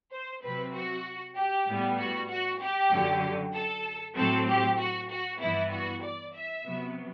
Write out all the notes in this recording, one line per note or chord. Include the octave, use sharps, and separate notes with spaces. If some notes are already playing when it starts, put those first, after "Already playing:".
C5
C3 F#3 C4 B4
F#4
G4
A2 G3 B3
F#4
F#4
G4
F#2 D3 F#3
A4
A2 F#3 C4 A4
G4
F#4
F#4
G2 E3 B3 E4
F#4
D5
E5
C3 F#3 B3